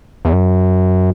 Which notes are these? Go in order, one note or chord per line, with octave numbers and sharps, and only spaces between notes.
E2
F#2